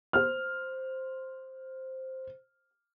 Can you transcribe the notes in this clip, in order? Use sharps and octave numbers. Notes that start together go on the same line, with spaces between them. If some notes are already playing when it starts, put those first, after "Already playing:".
C5 F6